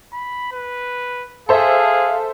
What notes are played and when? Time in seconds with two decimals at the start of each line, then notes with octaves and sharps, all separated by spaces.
0.13 B5
0.53 B4
1.49 G#4 A4 C5 E5 F5